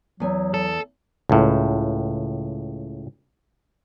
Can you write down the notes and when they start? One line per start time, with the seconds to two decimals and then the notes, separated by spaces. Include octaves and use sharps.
0.20 E2 F#3 G#5
0.54 A4
1.30 C#2 A2